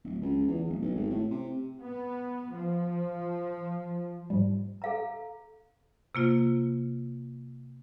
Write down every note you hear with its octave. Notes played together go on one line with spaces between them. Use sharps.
D1
C#2
E2
D1
B1
G#1
A2
C3
B3
F3
G#2 F3 G3
A4 F5 A#5
C3 A#3 F4